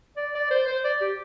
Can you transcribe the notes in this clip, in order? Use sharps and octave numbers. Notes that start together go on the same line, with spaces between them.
D5
D5
C5
C5
D5
G4